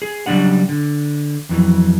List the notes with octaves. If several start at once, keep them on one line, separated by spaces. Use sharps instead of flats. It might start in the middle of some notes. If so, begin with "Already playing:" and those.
G#4
C#3 F#3 G3 D4 F#5
D3
F2 E3 F#3